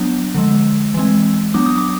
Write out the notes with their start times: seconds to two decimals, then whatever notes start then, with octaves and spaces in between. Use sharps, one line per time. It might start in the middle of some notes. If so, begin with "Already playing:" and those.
Already playing: F#3 B3 D4
0.35 D3 F3 G#3
0.94 E3 G#3 C4
1.54 F#3 B3 D4 D6
1.66 D#6
1.78 D6